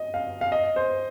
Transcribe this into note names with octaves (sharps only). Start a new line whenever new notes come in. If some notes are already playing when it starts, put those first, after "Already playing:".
Already playing: D#5
F5
F5
D#5
C5